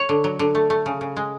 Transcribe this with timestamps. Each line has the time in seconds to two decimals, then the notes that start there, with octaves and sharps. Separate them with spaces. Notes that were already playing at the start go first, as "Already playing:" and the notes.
Already playing: C#5
0.09 D3
0.24 F#3
0.39 D3
0.55 A3
0.70 A3
0.86 C#3
1.01 C#3
1.17 G#3